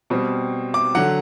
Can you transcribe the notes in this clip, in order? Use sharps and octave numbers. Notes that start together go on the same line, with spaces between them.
B2 G3 C4
D6
D3 F#3 F#5